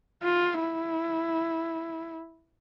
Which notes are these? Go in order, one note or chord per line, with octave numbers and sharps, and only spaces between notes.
F4
E4